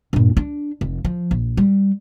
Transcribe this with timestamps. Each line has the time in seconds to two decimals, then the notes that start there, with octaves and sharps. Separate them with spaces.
0.13 G2 A#2
0.37 D4
0.81 F1
1.05 F3
1.31 A#1
1.57 G3